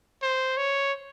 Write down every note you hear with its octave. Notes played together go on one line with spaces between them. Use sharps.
C5
C#5